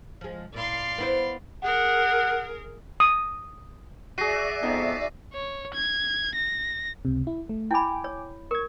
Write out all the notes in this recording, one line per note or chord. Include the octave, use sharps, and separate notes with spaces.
F3 G#3
A#2 E4 D5 F5 C6
B3 E4 C5
G#4 A#4 F#5
D#6
F#4 G#4 D5 E5 A#6 C7 D#7
F2 G#2 B3 D#4
C#5
G#6
A#6
C#2 C3
E4
A3
E4 G5 G#5 B5 D6
C#5
A#4 C#6 G#6